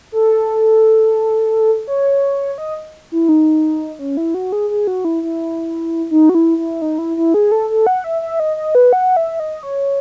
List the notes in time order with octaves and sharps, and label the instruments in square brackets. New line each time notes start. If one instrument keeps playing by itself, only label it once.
[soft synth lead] A4
C#5
D#5
E4
D#4
C#4
E4
F#4
G#4
G#4
F#4
E4
E4
D#4
F#4
E4
E4
D#4
E4
E4
G#4
A4
A4
F#5
E5
E5
D#5
D#5
B4
F#5
E5
D#5
C#5